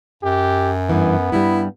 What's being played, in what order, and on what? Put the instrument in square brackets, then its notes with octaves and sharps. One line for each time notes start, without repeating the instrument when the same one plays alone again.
[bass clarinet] F#2 [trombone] G4
[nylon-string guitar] G2 E3 [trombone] B3
[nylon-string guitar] G2 G3 [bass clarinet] E4